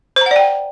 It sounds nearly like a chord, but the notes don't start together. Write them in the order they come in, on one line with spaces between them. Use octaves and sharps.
C5 A#5 F#5 D5 G5